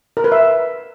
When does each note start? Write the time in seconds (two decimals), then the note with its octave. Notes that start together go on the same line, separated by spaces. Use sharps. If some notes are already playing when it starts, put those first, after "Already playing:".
0.17 A#4
0.24 B4
0.32 E5